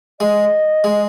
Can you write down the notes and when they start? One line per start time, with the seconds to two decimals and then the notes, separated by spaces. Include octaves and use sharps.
0.20 G#3 D#5
0.84 G#3